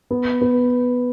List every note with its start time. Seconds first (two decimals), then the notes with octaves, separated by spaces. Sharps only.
0.11 B3
0.41 B3